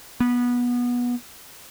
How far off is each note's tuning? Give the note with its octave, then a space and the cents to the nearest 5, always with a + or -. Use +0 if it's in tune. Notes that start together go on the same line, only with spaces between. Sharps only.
B3 -20